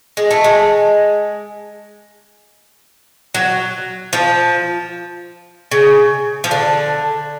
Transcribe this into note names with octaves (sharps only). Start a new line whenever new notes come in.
G#3
A3
G#3
F#3
F3
C#3
F3
D3